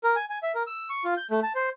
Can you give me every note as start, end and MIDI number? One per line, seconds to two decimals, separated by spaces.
0.04 0.15 70
0.16 0.25 80
0.30 0.38 80
0.43 0.52 76
0.55 0.63 70
0.67 0.89 88
0.90 1.03 85
1.05 1.14 65
1.17 1.27 91
1.31 1.40 57
1.43 1.53 81
1.55 1.69 72